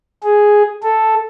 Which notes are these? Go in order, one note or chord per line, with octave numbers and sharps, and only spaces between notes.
G#4
A4